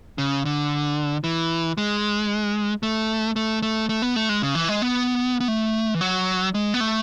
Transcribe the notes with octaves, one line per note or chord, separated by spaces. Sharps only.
C#3
D3
E3
G#3
A3
A3
A3
A3
B3
A3
G#3
C#3
E3
G#3
B3
B3
A3
E3
F#3
G#3
B3
A3